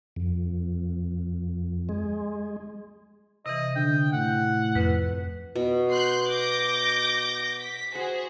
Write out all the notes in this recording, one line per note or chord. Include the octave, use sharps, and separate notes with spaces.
F2
G#3
C3 E3 D#5
D3 G5
A2 F#5
F2 B4
B2
C6 F#6 G6
D6 G6 A#6
B6
F#4 G#4 C5 F#5